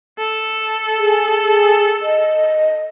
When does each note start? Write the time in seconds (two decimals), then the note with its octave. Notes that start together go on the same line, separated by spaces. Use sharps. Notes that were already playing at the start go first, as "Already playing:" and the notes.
0.18 A4
0.98 G#4
1.43 G#4
2.02 D#5